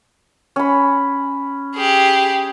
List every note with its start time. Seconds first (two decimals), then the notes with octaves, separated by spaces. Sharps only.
0.56 C#4 B5
1.75 G4 G#4